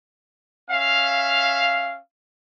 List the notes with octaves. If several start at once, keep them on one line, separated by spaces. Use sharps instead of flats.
C#4 E5 F5